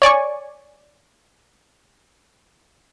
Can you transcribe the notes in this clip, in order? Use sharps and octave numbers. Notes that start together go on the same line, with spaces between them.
C#5 D5 G#5 C#6